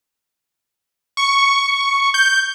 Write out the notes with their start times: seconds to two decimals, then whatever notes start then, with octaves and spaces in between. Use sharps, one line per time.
1.17 C#6
2.14 G6